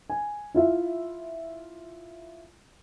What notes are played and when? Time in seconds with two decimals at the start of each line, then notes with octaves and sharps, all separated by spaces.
0.10 G#5
0.54 E4 F4 E5